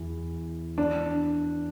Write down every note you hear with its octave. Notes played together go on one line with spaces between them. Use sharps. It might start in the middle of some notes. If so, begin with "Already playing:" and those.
Already playing: E2 E3 E4
D4